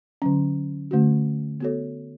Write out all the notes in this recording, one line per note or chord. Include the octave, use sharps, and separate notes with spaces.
D3 F#3 C#4
D3 A3 C#4 F#4
B3 F#4 A4 C#5